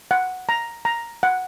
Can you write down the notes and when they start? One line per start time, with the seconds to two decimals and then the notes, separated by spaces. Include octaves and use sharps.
0.11 F#5
0.49 A#5
0.85 A#5
1.23 F#5